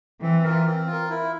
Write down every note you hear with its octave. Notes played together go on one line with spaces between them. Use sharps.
E3 C4
F4 A#4
C4
F4
A#4
E4